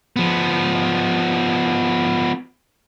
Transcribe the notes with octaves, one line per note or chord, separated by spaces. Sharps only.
F3 B3